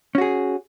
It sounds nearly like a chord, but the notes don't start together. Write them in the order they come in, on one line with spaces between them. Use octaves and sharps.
C#4 F#4 G#4